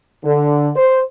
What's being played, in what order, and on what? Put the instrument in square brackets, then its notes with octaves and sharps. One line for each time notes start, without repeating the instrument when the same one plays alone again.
[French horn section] D3
C5